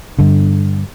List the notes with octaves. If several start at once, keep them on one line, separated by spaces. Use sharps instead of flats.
G2 D3